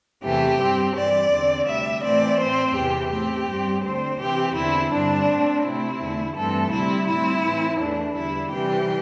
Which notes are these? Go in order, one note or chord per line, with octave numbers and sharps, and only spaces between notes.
E2 C3 E3 A3 G4
G2 G3 C4
G2 E3 C4 D5
E2 D3 C4
D2 C3 G3 E5
A2 E3 A3 C4 D5
A2 A3 C4 C5
E2 C3 E3 G4
A2 A3 C4 G4
G2 G3 C4
D2 D3 C4 C5
C3 E3 C4 G4
E2 D3 C4 E4
G2 D3 C4 D4
A2 A3 C4
C3 A3 C4 E4
E2 D3 A3
G2 E3 A3 C4 A4
D2 C3 G3 C4 E4
A2 G3 C4 E4
A2 E3 C4
E2 E3 A3 D4
E2 D3 G3 E4
C3 E3 G3 C4 G4